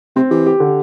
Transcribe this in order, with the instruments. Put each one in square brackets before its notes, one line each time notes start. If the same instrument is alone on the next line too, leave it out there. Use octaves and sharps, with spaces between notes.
[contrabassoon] C3 [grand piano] C4
[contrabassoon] E3 [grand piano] G4
[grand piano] G4
D3